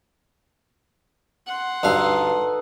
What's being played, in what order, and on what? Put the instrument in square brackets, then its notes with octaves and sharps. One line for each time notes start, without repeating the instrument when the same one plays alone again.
[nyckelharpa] F#5 C6
[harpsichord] D2 G2 F5 [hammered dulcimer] D#4 A4 B4